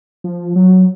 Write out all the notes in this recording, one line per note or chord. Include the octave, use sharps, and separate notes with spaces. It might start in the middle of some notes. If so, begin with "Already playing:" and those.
F3
F#3